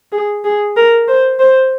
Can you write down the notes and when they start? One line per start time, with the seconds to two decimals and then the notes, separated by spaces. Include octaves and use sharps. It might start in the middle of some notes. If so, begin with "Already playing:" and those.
0.12 G#4
0.44 G#4
0.77 A#4
1.08 C5
1.40 C5